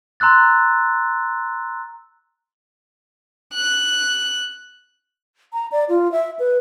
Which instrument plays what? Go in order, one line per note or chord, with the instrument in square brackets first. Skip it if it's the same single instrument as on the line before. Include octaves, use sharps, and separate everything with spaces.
[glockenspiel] A#5 C6 E6 F#6 A6
[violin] F#6
[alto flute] A#5
D5
F4
E5
B4